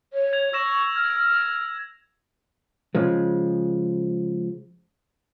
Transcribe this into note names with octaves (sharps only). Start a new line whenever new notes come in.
C#5
G#6 F7
C#6 E6 A#6 E7
F6 G#6
C#3 F3 G#3